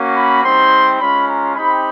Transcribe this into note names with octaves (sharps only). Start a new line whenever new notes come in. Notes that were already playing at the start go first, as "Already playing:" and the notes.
Already playing: A#3 C#4 F#4
B5
G3 C4 D#4 C6
G#3 C#4 F4 B5
A#5
C4 D#4 G4 B5